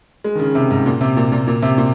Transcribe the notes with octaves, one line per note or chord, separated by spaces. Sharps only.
G#3
D#3
C#3
C3
G#2
A#2
C3
A#2
A#2
A#2
C3
A#2